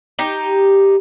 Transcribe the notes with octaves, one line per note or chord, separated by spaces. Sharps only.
D#4 G4